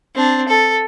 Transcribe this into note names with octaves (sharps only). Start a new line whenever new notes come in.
C4 D4
A4